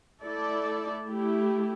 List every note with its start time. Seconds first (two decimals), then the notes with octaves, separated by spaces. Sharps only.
0.22 A3 E4 A4 D5
1.08 A3 E4 G4